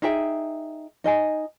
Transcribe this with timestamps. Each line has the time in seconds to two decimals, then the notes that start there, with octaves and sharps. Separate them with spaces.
0.02 D#4 G#4 E5 G5
1.04 D#4 D#5 G#5